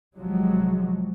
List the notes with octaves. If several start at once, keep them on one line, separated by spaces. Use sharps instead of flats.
G#1 C3 F3 F#3 G#3